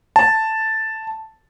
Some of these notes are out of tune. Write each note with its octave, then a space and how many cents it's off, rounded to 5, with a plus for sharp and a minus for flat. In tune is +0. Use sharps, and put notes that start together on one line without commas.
A5 +0